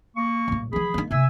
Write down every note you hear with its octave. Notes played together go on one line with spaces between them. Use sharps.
A#3 C#6
D#1 A2
E3 F3 G#4 B5
A#3 D#4
C3 A#3 E5 G#5 E6